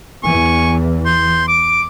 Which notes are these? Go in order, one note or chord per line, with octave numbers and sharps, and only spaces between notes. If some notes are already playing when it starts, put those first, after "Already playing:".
E2 E3 G#5 C#6
C6 G6
D6 D7